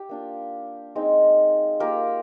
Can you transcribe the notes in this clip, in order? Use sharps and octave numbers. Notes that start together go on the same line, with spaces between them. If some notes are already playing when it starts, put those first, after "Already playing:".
Already playing: G4
A#3 D4 F4
G#3 C4 D#4
A#3 F4 G4 A#4